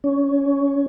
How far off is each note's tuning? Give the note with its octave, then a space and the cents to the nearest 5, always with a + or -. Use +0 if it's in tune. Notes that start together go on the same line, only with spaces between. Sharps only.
C#4 +15